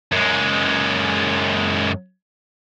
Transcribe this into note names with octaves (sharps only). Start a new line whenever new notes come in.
F#2 G#3